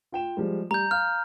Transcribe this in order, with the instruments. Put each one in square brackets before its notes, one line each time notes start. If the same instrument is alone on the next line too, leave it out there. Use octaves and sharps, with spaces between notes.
[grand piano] F4 G5 E7
F3 G3 G#3
[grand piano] G3 [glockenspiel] A#5 G6
[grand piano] F5 [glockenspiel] F6